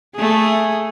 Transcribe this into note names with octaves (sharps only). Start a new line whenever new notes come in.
A3 G#4